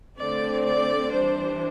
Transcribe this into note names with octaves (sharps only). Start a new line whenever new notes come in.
D3 A3 C4 D5
D5
E3 G3 D4 C5